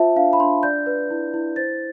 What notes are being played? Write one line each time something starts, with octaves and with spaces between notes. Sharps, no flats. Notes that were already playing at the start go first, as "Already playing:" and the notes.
Already playing: F4 C5 E5 A5
D4 F5
B5
D4 C6
D5 G6
B4
E4
E4
C5 A6